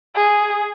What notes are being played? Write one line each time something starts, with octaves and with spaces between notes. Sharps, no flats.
G#4